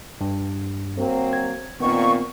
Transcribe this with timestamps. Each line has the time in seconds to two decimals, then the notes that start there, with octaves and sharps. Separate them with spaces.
0.21 G2
0.98 F#3 A#3 C4
1.33 G#6
1.80 A#2 D#3 B3 C4 C#6